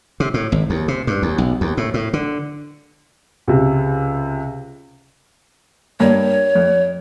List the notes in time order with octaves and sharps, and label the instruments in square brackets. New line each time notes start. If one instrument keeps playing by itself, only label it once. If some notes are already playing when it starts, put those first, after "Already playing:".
[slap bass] C3
A2
G#1
D#2
C3
G2
D#2
B1
D#2
A2
A2
D3
[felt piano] C#2 C3
[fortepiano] G2 A#3 [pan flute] C#5
[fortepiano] F2